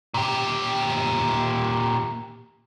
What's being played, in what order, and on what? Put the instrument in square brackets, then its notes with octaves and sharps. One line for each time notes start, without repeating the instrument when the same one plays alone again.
[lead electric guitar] A#2 G4